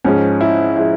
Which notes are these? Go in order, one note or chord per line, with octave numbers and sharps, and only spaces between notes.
G#2 F3 G#3 C#4
E4
F3 G#3 E4